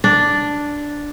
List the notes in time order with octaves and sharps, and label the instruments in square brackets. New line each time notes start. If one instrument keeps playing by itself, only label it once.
[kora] D4